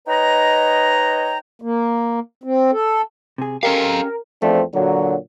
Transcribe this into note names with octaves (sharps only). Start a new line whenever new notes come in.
D#4 B4 C#5 D#5 G5 A#5
A#3
C4
A4
C3 G#4
C#4 G4 A4 A#4 D#5 F5
E2 F3 A3 C4 D4
A#2 D3 F#3